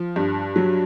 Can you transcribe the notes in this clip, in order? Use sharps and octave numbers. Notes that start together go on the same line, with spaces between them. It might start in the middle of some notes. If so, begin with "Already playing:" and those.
Already playing: F3
G2
F#3